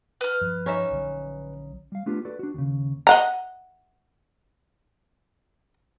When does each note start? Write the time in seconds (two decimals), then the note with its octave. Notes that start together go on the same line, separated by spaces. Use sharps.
0.21 B4 F6
0.41 G2 F3
0.66 C#4 D#4 E5
0.91 A#1 D3 F#3
1.92 G3 F5
2.06 A3 B3 D4 F4 G4
2.25 F#4 A4 B4 D5
2.39 D4 F#4
2.54 D#2 C#3
3.07 D#5 F#5 A#5